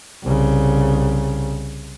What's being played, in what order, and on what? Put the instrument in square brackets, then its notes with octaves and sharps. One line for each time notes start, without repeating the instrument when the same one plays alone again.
[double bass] C2 C#3